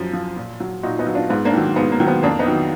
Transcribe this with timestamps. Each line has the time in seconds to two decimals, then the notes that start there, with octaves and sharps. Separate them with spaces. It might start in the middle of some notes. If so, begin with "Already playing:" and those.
Already playing: F#2 F3
0.13 F3
0.36 A#2
0.60 F#3
0.83 A#2 D#4 F#4
0.95 F4
0.99 B3 D#4
1.07 F#3
1.15 D4 F4
1.30 G#2 B3
1.45 A#3 D4
1.53 D#3 F#3
1.76 G#2 B3
1.92 A#3
2.00 D#3 F#3
2.07 B3
2.23 F2 A#3 D4
2.39 B3 D#4
2.46 D#3 F#3